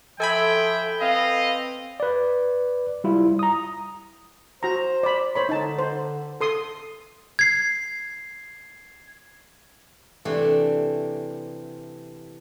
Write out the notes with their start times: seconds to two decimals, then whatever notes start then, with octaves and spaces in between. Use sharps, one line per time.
0.20 F3 A4 E5 G5 G#5 B5
1.01 C4 B4 D#5 F5
2.00 B4 D5
3.04 G3 E4 F4
3.39 A#5 D#6
4.63 F#4 C5 A#5
5.03 D5 B5
5.35 C5 C#5 B5
5.49 D3 D#4 A5
5.79 C5
6.41 A4 C6 D#6
7.39 G#6 C7
10.25 C3 E3 A3 C4 D4